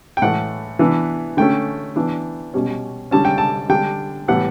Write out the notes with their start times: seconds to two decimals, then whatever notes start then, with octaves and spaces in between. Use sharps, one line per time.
0.17 G5
0.22 A2 E3 A3 F#5
0.79 E3 B3 D4
1.37 D3 A3 C#4 G5
1.96 E3 B3 D4
2.54 B2 G3 C#4
3.11 D3 G3 C#4 A5
3.25 G5
3.38 A5
3.69 D3 G3 D4 G5
4.28 A2 E3 G3 B3 F#5